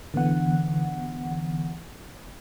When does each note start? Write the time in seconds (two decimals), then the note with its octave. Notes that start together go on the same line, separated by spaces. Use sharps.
0.14 D3 E3 B3 F#5